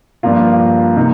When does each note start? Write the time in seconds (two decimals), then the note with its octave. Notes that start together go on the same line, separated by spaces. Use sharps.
0.23 G2 F3 A#3 F4
0.96 C3 F3 A#3 D#4